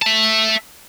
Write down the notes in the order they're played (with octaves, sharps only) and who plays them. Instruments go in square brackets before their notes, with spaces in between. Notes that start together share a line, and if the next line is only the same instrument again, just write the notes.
[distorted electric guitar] E5 A5